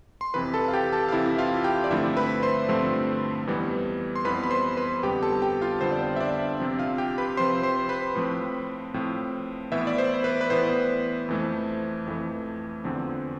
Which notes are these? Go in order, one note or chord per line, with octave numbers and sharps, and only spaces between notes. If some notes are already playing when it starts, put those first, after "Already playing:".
C6
F2 C3 E3 B4 B5
A4 A5
F5
G4 G5
A4 A5
F5
F2 C3 E3 E4 E5
F4 F5
G4 G5
D5
G2 D3 F3 A3 C4 E4 E5
B4 B5
C5 C6
G2 D3 F3 A3 C4
F2 E3 G3 B3
C6
F2 E3 G3 B3 B4 B5
B5
C5 C6
B4 B5
F2 D3 G3 B3 G4 G5
A4 A5
G4 G5
F4 F5
F2 D3 G3 B3 C5
D5
C5
E5
D4 D5
C3 F3 C4
F4 F5
G4 G5
B4 B5
C3 F3 C4 C5 C6
C5 C6
B4 B5
A2 F3 C4
A2 F3 C4
A2 E3 B3 E4 E5
D5
C5
B4
B4
A2 E3 B3 C5
F2 E3 A3
F2 E3 A3
E2 D3 F3 C4